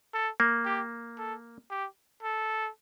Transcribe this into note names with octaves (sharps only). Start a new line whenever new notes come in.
A4
A#3
G4
A4
G4
A4